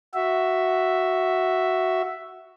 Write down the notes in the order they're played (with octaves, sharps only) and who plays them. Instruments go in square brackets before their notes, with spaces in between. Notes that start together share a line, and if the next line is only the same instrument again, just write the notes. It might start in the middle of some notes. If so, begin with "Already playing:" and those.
[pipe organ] F#4 E5